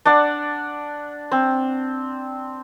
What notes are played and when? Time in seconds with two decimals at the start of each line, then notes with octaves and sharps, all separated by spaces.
0.05 D4 D5 F#5
1.31 C4